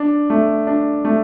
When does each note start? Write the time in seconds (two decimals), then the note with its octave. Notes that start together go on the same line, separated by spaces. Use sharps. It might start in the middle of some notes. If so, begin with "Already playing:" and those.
Already playing: D4
0.30 A3
0.67 D4
1.05 A3